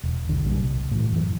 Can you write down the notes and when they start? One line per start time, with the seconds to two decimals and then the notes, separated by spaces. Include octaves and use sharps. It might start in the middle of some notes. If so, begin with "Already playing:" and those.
0.04 E1
0.28 B1 D3 D#3 G#3
0.45 F#1 B1 A#2 G3
0.62 C2
0.91 A2 E3
1.12 F#2 E3